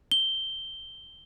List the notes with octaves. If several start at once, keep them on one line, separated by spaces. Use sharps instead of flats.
G7